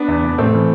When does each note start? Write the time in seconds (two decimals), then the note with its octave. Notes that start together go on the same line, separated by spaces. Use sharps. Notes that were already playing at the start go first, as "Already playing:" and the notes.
Already playing: B3 D4
0.08 E2
0.23 F1
0.38 A1 A3 C4
0.54 E3